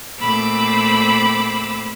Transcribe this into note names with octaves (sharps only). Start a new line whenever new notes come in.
A#2 A3 C4 B5 D6 E6